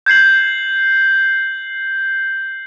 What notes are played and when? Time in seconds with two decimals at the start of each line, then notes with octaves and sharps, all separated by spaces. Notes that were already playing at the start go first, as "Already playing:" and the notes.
0.06 G6 G#6 C7 F#7